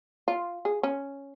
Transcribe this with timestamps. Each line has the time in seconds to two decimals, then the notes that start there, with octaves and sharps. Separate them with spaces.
0.28 F4
0.65 G#4
0.83 C#4